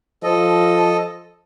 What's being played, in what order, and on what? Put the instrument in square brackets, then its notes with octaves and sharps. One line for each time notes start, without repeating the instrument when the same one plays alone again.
[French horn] F3 [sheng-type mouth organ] A4 D#5